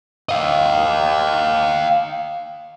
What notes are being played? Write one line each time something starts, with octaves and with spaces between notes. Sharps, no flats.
D#5 F5